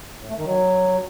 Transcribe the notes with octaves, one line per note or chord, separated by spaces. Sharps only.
A2
A3
D#3
F#3